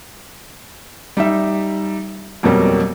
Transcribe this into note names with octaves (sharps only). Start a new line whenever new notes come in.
G3 D#4 E5
F2 B2 F#3 G3 A#3